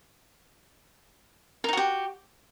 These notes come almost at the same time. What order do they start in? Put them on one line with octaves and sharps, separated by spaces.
A#4 D#4 F#4 G4